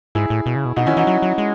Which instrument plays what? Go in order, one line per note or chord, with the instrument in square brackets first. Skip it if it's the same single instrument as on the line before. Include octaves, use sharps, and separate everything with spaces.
[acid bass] G#2 [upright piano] E4 G#4
[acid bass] A2
B2
C#3
B2
[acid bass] B2 [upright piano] D#4 F#4
[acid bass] D#3 [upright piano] C#4 E4
[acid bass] E3 [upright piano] D#4 F#4
[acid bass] F#3
F#3
G#3